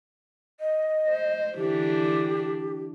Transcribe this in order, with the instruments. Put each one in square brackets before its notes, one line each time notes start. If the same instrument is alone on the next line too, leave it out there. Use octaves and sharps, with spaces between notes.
[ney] D#5
[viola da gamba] C5
[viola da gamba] D3 E3 D4 [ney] G4